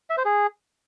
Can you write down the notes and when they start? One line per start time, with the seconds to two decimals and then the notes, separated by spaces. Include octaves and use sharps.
0.10 E5
0.17 C5
0.25 G#4